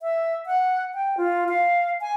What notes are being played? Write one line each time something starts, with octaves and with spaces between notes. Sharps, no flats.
E5
F#5
G5
F4
F5
G#5